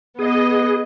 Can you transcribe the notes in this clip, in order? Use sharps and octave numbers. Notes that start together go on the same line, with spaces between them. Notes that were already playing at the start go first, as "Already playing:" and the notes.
B3 G#4 D#5